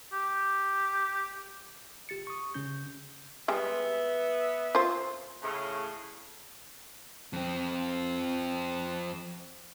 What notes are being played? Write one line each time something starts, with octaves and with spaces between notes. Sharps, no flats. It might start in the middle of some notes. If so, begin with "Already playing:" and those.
G4
G1 G4 A6 C#7
C#6 D#6
G#1 C#3 C#4 G6
G3 G#3 B3 E5
F4 C5
A2 C#3
F2 C4